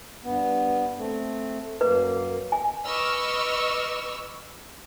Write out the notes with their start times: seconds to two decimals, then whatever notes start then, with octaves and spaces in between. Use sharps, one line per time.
0.24 G2 B3
0.98 A3 C4
1.81 F#2 A#3 B4
2.52 G#5
2.85 B4 D#5 C#6 D6 E6 F6